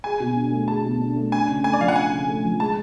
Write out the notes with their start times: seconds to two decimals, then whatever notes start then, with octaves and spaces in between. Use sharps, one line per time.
0.04 G#4 G#5
0.20 B2
0.36 D4
0.52 A3
0.68 G#4 A5
0.84 B2
1.01 D4
1.16 A3
1.32 D4 G#5
1.49 C#3
1.64 A3 G#5
1.73 D5
1.80 F3 F5
1.88 F#5
1.96 D4 G#5
2.12 C#3
2.28 A3
2.45 F3
2.60 G#3 A5